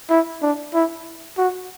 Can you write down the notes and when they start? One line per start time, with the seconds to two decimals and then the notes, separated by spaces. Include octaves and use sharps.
0.10 E4
0.42 D4
0.74 E4
1.38 F#4